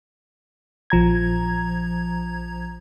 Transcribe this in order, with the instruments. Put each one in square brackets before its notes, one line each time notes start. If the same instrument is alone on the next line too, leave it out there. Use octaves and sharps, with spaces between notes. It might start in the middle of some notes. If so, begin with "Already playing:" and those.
[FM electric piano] A#1 F3 A#5 G#6